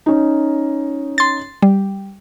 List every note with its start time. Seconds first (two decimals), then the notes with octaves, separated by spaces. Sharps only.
0.06 C#4 D#4
1.18 C6 A6
1.62 G3